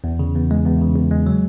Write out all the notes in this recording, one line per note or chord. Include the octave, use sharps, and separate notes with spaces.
E2
C#3
E2
G#3
E2
C#3
E2
G#3
F#3